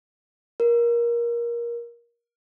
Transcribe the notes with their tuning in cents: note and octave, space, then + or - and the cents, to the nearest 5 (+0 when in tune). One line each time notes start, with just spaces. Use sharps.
A#4 +20